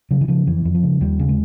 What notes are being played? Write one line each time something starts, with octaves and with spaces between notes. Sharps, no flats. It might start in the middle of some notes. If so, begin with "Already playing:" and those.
C#3 F#3
E3
C#3 F3
F2 E3
F2
F3
C#3
D#2 G3
C#3
G#3